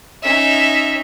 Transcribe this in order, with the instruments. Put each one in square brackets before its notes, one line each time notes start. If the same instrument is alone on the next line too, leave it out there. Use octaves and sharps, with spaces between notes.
[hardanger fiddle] C#4 D#4 [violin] E5